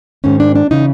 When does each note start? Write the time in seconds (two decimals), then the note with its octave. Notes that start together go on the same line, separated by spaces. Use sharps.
0.24 G#2 D#3 C#4
0.40 D4
0.55 D4
0.71 C#3 E3 D#4